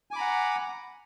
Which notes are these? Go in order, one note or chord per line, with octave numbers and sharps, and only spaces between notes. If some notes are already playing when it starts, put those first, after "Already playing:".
F#5 G#5 A#5 B5 D6